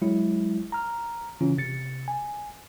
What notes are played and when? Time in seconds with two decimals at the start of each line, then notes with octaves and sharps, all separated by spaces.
0.02 F#3 G#3 E4
0.72 A#5 F6
1.41 C#3 E3 C#4 F4
1.58 C3 A6 C#7
2.08 G#5